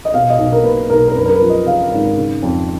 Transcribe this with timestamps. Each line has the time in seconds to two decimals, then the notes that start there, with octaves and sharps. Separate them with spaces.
0.05 D#5
0.14 B2 F5
0.30 D#5
0.38 B1
0.52 A#4
0.64 A#3 B4
0.90 B1 A#4
1.08 A#4
1.15 F#2 B4
1.25 A#4
1.32 B4
1.41 F3
1.50 D#5
1.66 C#3 F5
1.92 G#1
2.17 C#3
2.43 F2